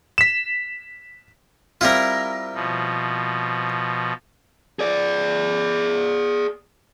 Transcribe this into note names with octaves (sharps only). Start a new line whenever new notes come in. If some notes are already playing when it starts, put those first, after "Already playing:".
B6 E7
G3 C4 E4 F4 A#4
B2 F3
G#4 D5